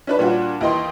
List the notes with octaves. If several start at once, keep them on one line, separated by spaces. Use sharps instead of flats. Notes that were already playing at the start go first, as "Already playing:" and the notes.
C#4 D4 B4
A#2 G3 D4 F#4
D#2 E3 D#5 G5 C6